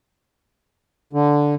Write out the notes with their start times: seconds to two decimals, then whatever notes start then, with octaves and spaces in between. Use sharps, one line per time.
1.13 D3